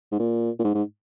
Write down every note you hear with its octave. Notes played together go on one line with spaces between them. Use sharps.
G#2
A#2
A#2
G#2
G#2